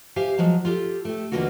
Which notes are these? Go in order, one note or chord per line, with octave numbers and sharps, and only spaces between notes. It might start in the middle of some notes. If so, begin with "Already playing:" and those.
G4 C5 E5 F5 G#5
F3 F#3 G#3
F4 G4 A4
A3 G4
D#2 D3 E3 A#3 F4 F#4